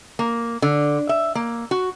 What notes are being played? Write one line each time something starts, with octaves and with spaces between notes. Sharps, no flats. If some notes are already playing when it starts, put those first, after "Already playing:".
A#3
D3
E5
A#3
F#4